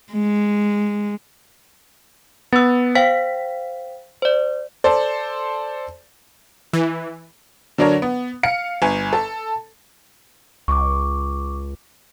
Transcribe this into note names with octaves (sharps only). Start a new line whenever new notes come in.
G#3
B3 E6 A6
C5 F5 G5 B6
C5 D5
A4 C5 D5
E3
D3 F#3 D4 A#4 C#5
B3
F5 C#7
G1 G#5
A4 A5
C#2 C#6 D6